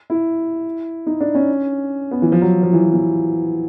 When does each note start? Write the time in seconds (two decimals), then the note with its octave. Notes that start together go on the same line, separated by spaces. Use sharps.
0.10 E4
1.06 D#4
1.21 D4
1.35 C#4
2.11 B3
2.22 E3
2.32 F3
2.42 F#3
2.63 F3
2.73 E3
2.83 F3
2.94 E3